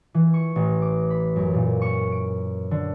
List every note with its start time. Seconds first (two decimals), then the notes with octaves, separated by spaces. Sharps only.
0.14 E3
0.34 C#6
0.56 A1
0.82 D6
1.10 B5
1.36 F#2
1.54 A#2
1.82 C#6
2.12 D7
2.71 D3